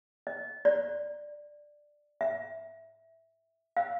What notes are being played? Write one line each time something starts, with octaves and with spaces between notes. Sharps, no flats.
D#5
D5
E5
F5